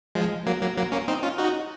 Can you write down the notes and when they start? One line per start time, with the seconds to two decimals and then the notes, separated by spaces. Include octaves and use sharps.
0.15 F3 G#3
0.46 F#3 A#3
0.61 F#3 A#3
0.77 F#3 A#3
0.92 A#3 C#4
1.08 C4 D#4
1.23 C#4 F4
1.38 D#4 F#4